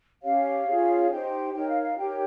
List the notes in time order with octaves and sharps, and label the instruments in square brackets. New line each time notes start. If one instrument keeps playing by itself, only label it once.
[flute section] C#4 G4 C#5 F5
C#4 F4 G#4 C#5
D#4 G4 C5 G5
D#4 A#4 C#5 G5
F5
F5
D#4 G4 A#4 C#5 G5